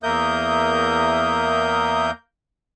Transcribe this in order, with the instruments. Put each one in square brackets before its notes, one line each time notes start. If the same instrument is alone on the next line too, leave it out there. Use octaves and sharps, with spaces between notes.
[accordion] E2 E5 D#6 [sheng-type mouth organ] A#3 A#4 G6